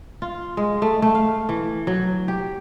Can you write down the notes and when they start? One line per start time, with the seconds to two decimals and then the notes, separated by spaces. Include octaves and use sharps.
0.22 F4
0.57 G#3
0.82 A3
1.02 A3
1.15 F5
1.49 E3
1.87 F#3
2.28 G4